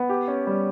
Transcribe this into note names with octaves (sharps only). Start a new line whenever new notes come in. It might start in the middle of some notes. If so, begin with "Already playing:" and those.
Already playing: B3
G4
C#4
G3